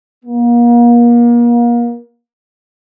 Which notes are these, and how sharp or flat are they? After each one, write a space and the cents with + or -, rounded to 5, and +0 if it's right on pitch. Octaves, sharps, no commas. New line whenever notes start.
A#3 +35